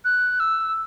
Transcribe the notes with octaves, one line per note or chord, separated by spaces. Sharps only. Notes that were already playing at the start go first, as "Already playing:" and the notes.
F#6
E6